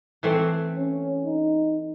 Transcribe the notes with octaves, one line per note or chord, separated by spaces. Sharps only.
E3 A3 C4
C#4
D#4